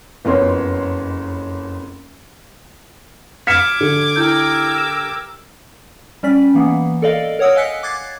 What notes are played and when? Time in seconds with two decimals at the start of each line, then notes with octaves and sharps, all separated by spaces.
0.25 F#1 F2 B3 A#4 C#5 C6
3.47 D6 F6 G#6 B6 C#7 E7
3.81 D3
4.16 E4 G4 A#4 E6 G6
4.78 E7
6.23 G3 C#4 D5 B6
6.55 E3 A#3 B3
7.02 A4 A#4 D5 D#5 F5
7.39 A#4 C#5 F#5 D#6 E6
7.55 D#5 F5 G#5 F#6 B6 C#7
7.83 D6 F#6 G#6 A6 C7